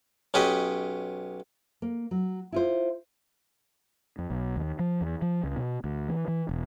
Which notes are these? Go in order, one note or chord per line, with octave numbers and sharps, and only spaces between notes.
B1 C#4 G4 B4 D#5
A#3
F#3
E4 F4 C5
F2
B1
D#2
F3
E2
F3
C#2
B2
D2
E3
E3
E1